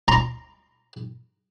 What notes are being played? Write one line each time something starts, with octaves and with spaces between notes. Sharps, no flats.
A#5 C6